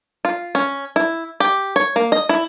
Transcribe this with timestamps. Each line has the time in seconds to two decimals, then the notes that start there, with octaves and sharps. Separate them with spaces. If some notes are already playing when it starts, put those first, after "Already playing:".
0.25 F4
0.55 C#4
0.96 E4
1.40 G4
1.76 C#5
1.96 A#3
2.12 D#5
2.29 E4